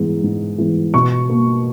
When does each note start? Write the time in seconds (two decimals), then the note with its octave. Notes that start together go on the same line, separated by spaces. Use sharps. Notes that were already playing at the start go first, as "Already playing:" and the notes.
Already playing: G#2 E3 G#3 B3
0.23 G#2
0.58 E3 G#3 B3
0.94 B2 C#6
1.29 A#3